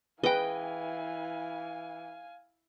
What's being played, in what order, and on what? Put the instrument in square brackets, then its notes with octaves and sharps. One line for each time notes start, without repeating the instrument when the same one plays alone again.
[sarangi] E3 [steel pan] G#4 B4 [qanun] D#5 G5 [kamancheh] F5 G#5